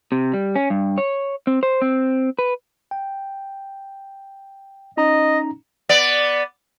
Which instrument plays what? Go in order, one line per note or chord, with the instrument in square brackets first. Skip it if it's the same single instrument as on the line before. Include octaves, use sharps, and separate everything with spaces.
[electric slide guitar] C3
G3
C#4
G2
C#5
C4
C5
C4
B4
[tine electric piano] G5
[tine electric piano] C#4 D#4 A#5 [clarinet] D#5
[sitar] B3 D5